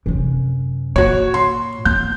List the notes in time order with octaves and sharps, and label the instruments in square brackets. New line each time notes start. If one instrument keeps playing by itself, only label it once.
[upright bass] F#2 C3
[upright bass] A#2 [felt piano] F#4 C#5
[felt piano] C6
[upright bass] B3 [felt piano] G6